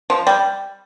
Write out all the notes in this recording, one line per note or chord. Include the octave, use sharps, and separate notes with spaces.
F3
G3